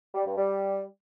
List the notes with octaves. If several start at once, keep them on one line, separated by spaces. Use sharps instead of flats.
G3
G2
G3